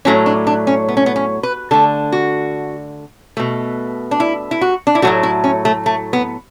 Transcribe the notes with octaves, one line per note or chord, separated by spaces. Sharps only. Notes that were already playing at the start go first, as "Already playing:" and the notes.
A2 F#3 A3 C#4
D4
D4
C#4
B3
C#4
B3
C#4
B4
D3 A3 A4
F#4
B2 A3
D4
E4
E4
F#4
D4
E4
A2 F#3 A3 F#4
E4
C#4
A3
A3
B3